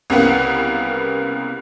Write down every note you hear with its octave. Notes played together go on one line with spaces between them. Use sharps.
C2 C#3 A#3 B3 F#5